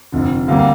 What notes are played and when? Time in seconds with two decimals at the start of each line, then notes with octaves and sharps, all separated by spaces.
0.12 F1 F2 D3
0.48 D2 C3 G3 A#3 F5
0.59 F5